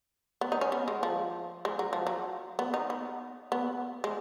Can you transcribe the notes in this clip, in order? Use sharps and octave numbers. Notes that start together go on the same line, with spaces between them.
B3
D#4
C#4
B3
G#3
F3
G#3
F#3
F3
F#3
B3
D#4
B3
B3
G#3